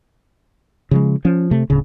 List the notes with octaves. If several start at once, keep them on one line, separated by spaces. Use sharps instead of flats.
C#3 F3 G#3
F3 C#4
C3 A3
D1 C#3